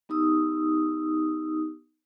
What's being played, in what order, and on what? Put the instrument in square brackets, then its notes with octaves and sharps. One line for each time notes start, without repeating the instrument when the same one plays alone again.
[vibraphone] B3 D#4 G4 D#6 E6